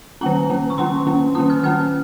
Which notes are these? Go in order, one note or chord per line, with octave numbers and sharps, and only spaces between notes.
D#3 A#3 C#4 A#5
D#3 A#3 C#4
C#6
D#3 A#3 C#4 C6
D#3 A#3 C#4
D#3 A#3 C#4 D#6
F6
D#3 A#3 C#4 F6